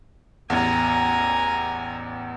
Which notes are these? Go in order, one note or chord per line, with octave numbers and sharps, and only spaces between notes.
A1 E2 G#5 A#5